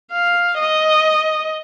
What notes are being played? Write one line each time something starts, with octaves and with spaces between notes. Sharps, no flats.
F5
D#5